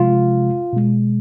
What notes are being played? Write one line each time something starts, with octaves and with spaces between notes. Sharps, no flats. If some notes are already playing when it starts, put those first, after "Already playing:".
Already playing: C3 F3 G#3 F4
B2 G#3